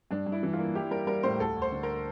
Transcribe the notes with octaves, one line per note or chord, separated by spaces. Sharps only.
G2 D4
G2
E4
E3
F4
A#3
E4 G4
G3 A#4
G3 A#4
A2 C5
D2 A4
D2
C5
D3
A#4